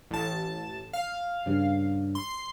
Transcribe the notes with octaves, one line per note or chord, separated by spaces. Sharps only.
A1 A5
F5
G2 C#3
C6